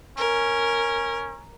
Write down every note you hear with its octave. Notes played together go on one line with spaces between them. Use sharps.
C#4 A#4